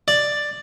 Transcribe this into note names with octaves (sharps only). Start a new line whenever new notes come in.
D5